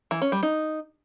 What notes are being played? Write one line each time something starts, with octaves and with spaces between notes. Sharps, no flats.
E3
C#4
G3
D#4